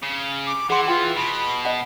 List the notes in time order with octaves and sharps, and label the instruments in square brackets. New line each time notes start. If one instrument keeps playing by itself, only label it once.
[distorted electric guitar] C#3
[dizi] D6
[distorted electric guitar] E3 [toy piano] G#4 C6 [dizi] F#5
[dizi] F4 [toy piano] G5
[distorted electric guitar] B2 [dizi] B5
[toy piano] D#5 F#5